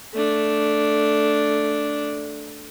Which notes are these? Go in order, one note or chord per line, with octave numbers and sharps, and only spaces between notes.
A3 D4